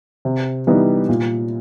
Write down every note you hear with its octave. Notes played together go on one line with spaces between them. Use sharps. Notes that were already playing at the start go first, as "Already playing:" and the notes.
C3
E3 G3 B3 D#4
A#2